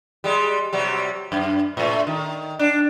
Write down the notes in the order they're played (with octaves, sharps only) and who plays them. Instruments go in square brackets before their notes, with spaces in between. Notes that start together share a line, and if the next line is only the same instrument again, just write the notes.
[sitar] G3 G#3
C3 F#3 G3
F#2
A2 A3
D#3
D4